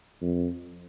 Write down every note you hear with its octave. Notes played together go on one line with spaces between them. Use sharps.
F2